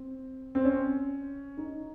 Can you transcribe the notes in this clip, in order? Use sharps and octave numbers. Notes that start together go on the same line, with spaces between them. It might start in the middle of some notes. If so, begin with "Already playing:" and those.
Already playing: C4
C4
C#4
D#4